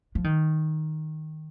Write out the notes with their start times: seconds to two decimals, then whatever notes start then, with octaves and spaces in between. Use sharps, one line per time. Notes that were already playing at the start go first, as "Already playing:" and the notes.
0.15 F3
0.24 D#3